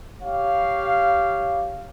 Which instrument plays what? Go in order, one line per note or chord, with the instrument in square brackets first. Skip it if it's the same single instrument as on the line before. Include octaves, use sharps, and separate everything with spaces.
[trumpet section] G4 C#5 F5